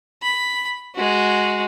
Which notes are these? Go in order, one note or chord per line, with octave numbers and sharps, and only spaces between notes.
B5
G#3 F#4